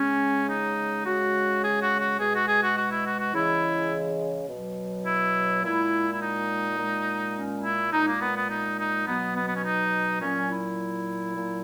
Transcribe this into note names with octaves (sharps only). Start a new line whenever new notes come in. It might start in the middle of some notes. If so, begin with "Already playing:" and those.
Already playing: C#3 G#3 C#4
D#4
C#3 G#3 F#4
G#4
F#4
F#4
B2 G#3 G#4
F#4
G#4
F#4
F#4
E4
F#4
F#4
C#3 E3 G#3 E4
B2 F#3
E4
A#2 G#3 E4
E4
D#4
A#2 G#3
C#4
E4
A#2 G#3 D#4
A#3
B3
B3
D#4
D#4
B2 F#3 B3
B3
B3
C#4
D#4
A#2 F#3 C#4
E4
A#2 F#3